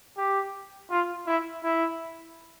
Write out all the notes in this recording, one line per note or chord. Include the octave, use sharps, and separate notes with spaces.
G4
F4
E4
E4